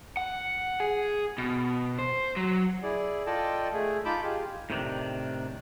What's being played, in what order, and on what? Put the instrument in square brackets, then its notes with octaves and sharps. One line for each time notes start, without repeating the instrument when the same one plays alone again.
[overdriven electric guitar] F#5
G#4
B2
C5
F#3
[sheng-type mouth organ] E4 G#4 D5
F4 A4 D5 D#5 G5 A5
A3 G#4
D#4 F4 A5 B5 D6 G6
F4 G4 G#4
[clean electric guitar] A2 C3 D#3 D4